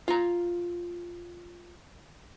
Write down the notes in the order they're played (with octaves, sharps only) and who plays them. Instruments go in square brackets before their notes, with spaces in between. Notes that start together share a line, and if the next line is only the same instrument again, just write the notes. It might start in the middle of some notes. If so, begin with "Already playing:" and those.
[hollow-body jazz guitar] F4 A#5